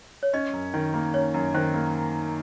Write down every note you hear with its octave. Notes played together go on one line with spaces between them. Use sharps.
C#5
C#4 D#5
F#2
D#3
A#3
C#4 C#5
F#2
D#3 C5
A#3